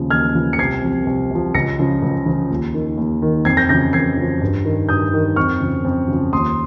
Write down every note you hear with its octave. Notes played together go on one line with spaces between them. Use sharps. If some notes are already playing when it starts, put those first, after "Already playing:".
Already playing: D#2 C#3 F3
D#2 F6 G#6
C#3 F3
C#7
C2 G#6 C7
C3 F3
C2
C3 F3
C#2 A#6 C#7
C#3 F3
C#2
C#3 F3
D#2
D#3
D#2
D#3
F2 G#6 C7
G6 A#6
C#3 F3 G6 A#6
F2 G#6 C7
C#3 F3
G2
D#3
G2 D#6 G6
D#3
F2 C#6 F6
C#3 F3
F2
C#3 F3
D#2 C6 D#6